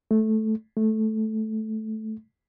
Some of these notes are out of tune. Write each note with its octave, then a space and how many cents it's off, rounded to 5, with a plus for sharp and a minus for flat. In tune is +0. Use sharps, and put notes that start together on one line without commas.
A3 -10
A3 -10